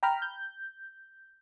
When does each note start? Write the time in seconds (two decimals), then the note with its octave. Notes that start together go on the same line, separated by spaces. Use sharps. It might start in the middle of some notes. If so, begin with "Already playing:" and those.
0.03 G5 A#5 B5 F6
0.22 G6